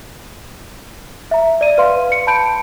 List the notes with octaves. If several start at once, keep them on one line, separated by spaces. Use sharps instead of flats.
E5 A#5
D5 D#7
B4 F5 C6
C#7
A5 B5 G6 D7